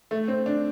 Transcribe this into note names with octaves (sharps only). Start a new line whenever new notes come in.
A3
C4
D4